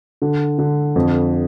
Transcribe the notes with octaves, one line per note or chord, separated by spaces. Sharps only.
D3
D3
F2